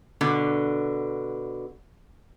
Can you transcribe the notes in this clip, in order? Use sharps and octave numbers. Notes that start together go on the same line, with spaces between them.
B2 D3